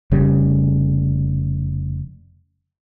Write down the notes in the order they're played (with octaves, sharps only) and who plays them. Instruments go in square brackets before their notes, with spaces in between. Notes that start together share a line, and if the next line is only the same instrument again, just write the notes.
[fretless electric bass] F1 C#3 G3